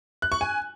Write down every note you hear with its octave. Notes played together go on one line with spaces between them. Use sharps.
F#6
C#6
G#5